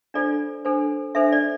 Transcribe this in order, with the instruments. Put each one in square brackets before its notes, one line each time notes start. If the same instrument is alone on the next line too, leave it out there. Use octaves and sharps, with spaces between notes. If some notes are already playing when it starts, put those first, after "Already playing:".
[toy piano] D4 F4 A4 C5 D5
D4 A4 C5
D4 A4 C5 E5
D5